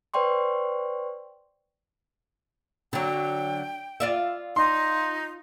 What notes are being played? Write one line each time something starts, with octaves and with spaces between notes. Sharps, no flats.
B4 C5 D5 G5 C6 C#6
D3 F#3 G5
F4 D5 E5
D#4 C6